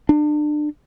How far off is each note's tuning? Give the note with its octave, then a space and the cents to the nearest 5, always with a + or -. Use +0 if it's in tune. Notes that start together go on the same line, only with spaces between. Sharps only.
D4 +30